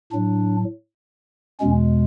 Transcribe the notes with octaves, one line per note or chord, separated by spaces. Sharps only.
A2 F#3 D4
E2 B2 G#3 C#4